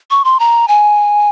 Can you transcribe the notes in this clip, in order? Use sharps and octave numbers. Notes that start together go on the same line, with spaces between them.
C#6
C6
A#5
G#5